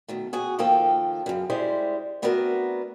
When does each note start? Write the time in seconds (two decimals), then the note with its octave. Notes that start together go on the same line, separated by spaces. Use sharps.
0.08 B2 D#3 A3
0.33 B2 F#4 G#4
0.59 D#3 F3 A#3 F4 A4 G5
1.26 F#2 C#3
1.50 G3 G#3 E4 C5
2.22 A3 B3 C4 D4 F#4 A#4